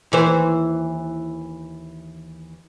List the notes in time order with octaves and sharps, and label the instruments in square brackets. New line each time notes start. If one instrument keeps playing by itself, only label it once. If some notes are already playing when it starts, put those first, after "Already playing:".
[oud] D#2 E3 C5